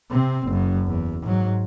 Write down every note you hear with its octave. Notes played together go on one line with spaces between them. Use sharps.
C3 C4
F#1 F#2
E2
G#2 F#3